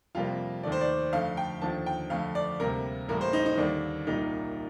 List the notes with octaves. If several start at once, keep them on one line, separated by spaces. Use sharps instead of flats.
F2 C3 G3 A#3 F4
D#2 D#3 A3 D5
C5
D5
F2 D3 A3 F5
G5
D#2 D3 F3 A5
G5
F2 D3 A3 F5
D5
D2 C3 G3 A#3 A#4
A1 A2 G3 A#3 A#4
C5
D#4
D#4
D#2 D3 G3 A#3 D4
C2 A#2 G3 A#3 D#4